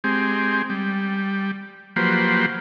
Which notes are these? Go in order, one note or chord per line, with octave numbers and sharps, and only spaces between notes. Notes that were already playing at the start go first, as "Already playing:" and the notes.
G#3 C4 G4
G3
F3 F#3 A#3 G4 B4 C5